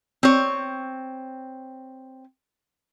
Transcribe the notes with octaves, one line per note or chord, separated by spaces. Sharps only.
C4 C#5